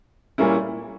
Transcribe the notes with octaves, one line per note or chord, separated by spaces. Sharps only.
A#2 G3 A#3 C#4 E4